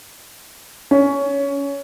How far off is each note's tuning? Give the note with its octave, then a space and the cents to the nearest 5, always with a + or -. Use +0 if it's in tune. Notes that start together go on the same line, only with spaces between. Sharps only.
C#4 +15